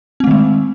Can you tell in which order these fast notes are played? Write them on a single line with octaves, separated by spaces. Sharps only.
C4 A3 D#3 G#3